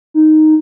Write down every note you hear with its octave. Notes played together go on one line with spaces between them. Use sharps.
D#4